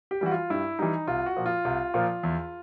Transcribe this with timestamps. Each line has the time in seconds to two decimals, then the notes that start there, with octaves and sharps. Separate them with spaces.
0.11 G4
0.21 E3 G3 F#4
0.31 F4
0.50 G2 E4
0.79 E3 G3 D#4
1.07 C2 F4
1.26 F#4
1.37 A#2 F3
1.46 F4
1.65 C2
1.94 A#2 F3
2.23 E2